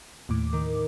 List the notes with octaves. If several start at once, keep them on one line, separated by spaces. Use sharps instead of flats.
D#2 A2 D6
D#3